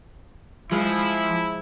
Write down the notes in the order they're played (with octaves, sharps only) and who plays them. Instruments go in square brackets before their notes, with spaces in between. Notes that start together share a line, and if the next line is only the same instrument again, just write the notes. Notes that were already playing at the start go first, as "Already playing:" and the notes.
[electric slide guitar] F3 [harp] G#3 C5 [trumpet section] E4